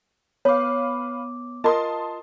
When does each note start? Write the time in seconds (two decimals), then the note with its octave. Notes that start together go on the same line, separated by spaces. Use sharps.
0.45 B3 B4 C#5 F5 D6
1.64 F4 A#4 D#5 A5 C6 D#6